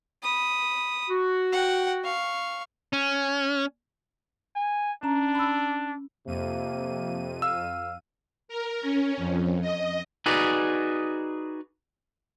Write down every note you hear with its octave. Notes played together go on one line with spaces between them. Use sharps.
B5 D#6
F#4
F#5 G5
F5 C#6
C#4
G#5
C#4 D4 A#5
B5 E6
F2 C3 A#3 D#7
F5 E6
A#4
C#4
F2
D#5
D#4 F#4 G#4 B4 D5